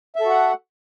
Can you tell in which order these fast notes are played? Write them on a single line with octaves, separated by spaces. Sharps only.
E5 A4 F#4 F#5